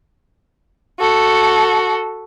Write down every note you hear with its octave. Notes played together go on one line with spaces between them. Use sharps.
F#4 A4